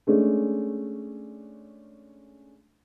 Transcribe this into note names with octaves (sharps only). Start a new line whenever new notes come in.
G#3 A3 C#4 D4